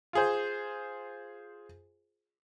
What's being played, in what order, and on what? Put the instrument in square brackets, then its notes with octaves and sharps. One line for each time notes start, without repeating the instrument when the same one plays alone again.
[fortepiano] F4 G#4 C5